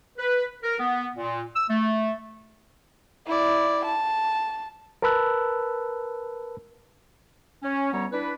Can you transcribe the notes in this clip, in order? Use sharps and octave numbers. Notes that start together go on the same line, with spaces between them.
B4
A#4
B3
A#2
E6
A3
E4 D5
A5
A#4 B4 A5 B5 E6 F#6
C#4
D2 G3 B3 C#5 A#5
D4 E4 B4